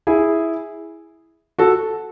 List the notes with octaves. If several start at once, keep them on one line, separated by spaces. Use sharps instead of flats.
E4 G#4
F#4 A4